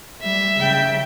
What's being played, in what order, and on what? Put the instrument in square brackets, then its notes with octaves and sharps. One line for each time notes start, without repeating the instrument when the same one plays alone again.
[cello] G3 [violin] E5
[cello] C#3 G5